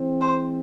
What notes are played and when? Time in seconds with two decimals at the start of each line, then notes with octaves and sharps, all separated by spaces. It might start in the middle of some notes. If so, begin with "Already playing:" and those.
Already playing: E3 G#3 C4
0.21 C5